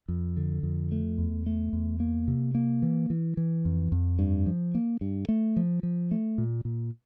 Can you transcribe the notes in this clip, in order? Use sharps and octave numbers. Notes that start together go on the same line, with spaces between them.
F2
D3
F2
A3
E2
A3
E2
A#3
C3
A#3
E3
E3
E3
F2
F2
G2
F3
A#3
G2
A3
F3
F3
A3
A#2
A#2